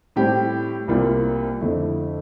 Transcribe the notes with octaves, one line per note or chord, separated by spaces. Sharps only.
A2 G3 C4 G4
C2 C3 G3 A#3 F4
F2 D3 A3 E4